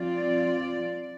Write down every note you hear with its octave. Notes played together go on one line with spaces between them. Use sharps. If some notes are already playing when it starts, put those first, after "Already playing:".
Already playing: F3 C4 F4 D5